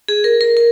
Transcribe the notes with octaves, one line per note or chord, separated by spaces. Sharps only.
G#4
A#4
A#4
A#4